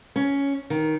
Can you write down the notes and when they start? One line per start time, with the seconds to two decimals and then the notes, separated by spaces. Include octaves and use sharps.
0.16 C#4
0.70 D#3